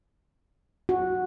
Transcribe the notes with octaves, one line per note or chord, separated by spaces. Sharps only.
F#4